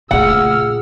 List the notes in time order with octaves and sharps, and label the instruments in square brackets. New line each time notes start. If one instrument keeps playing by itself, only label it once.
[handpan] A#2 G#4 [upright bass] C#3 A3 [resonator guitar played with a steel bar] F#5 [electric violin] E6 F6